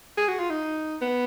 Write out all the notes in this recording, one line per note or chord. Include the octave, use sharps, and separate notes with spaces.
G#4
F#4
F4
D#4
B3